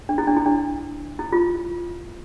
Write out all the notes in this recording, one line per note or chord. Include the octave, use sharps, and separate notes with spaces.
D4
E4
D4
E4
D4
E4
F4